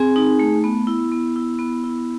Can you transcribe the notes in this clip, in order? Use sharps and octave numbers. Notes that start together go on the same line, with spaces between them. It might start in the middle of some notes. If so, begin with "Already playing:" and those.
Already playing: C4 G#4 G#5
D#4
A3
B3
E4
B3
E4
B3
E4